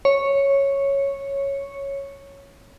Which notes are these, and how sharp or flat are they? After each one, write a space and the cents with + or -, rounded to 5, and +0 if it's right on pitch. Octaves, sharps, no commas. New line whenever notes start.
C#5 -5